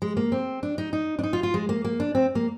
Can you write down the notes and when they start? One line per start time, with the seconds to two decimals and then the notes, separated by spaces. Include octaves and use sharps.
0.02 G#3
0.17 A#3
0.32 C4
0.63 D4
0.78 D#4
0.93 D#4
1.19 D4
1.23 D#4
1.33 F4
1.43 F4
1.54 G#3
1.69 A#3
1.84 A#3
2.00 D4
2.15 C4
2.35 A#3